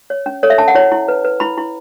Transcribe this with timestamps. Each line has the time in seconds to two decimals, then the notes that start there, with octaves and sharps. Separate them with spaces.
0.10 C#5
0.26 C#4
0.43 A4 C#5
0.50 E5
0.58 C#4 A5
0.68 F#5
0.75 E4 C#5
0.92 E4
1.08 B4
1.25 B4
1.40 E4 B5
1.58 E4